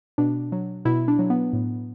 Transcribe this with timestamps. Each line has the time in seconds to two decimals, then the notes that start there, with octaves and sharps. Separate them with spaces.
0.18 B2 D4
0.52 F#3
0.85 B2 E4
1.08 D4
1.19 F#3
1.30 B3
1.53 A2